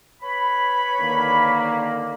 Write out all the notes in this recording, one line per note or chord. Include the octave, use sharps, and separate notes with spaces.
B4 C#5 B5
D3 D#3 A#3